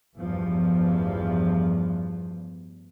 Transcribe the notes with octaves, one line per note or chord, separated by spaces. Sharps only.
A1 E2 G2 F3